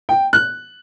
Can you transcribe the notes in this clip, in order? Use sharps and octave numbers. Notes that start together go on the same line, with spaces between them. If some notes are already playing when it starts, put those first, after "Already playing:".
G5
F#6